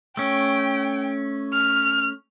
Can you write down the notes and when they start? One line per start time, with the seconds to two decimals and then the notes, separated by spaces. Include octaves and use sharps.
0.17 A3 C#4 G5
1.53 F6